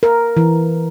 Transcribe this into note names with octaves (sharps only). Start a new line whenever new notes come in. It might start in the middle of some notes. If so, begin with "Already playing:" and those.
A#4
E3